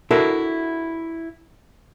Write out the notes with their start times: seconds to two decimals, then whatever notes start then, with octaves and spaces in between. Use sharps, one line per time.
0.11 D4 E4 F#4 A4 A#4